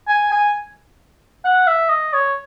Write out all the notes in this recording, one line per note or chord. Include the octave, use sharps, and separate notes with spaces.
G#5
G#5
F#5
E5
D#5
C#5